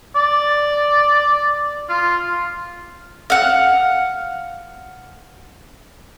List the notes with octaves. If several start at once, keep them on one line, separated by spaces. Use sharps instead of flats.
D5
F4
F5 F#5